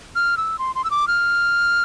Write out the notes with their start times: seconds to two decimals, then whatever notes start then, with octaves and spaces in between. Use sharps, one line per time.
0.16 F6
0.37 E6
0.59 C6
0.75 C6
0.84 E6
0.91 D6
1.08 F6